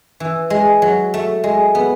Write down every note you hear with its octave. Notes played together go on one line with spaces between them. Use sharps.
E3
G#3
F#3
A3
G#3
B3